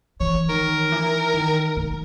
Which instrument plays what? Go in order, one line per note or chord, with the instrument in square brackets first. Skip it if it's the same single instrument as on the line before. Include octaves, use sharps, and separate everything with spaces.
[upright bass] E3 [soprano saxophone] C#5
[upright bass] D#3 [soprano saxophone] A#4
[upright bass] E3
D#3
D#3